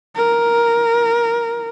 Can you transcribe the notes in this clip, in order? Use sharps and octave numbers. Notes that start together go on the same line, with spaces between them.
A#4